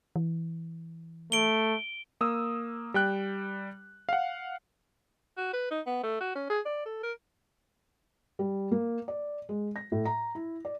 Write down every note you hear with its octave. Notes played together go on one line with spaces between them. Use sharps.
E3
A3 D7 G7
A#3 D#6 E6
G3 G5 F#6
F5 F#5
F#4
B4
D#4
B3
A3
F#4
C#4
G#4
D5
A4
A#4
G3
A#3
D5
G#3
A#6
A2
A#5
E4
D5